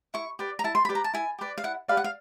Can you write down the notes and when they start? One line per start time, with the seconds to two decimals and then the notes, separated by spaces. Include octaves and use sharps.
0.14 E4 C#6
0.39 G4 B4 D5
0.59 A#5
0.64 E4 A5
0.75 C6
0.85 B5
0.89 G4 B4 D5
0.95 A#5
1.04 A5
1.14 E4 G#5
1.39 G4 B4 D5
1.58 F5
1.64 E4 F#5
1.88 G4 B4 D5 F5
1.97 F#5
2.04 F5